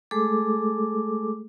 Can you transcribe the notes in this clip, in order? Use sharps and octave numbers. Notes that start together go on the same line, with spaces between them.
G#3 A3 G#4 A4 D6